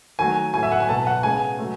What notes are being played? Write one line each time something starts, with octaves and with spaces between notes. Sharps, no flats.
D#3 F#3 A3 G#5
A2 F#3 B3 G#5
E5
F#5
G#5
B2 F#3 B3 A5
F#5
C#3 G#3 B3 G#5
F#3 A3